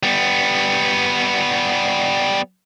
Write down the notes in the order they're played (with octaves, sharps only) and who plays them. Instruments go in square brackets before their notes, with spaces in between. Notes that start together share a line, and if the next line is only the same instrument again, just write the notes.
[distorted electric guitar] G3 B3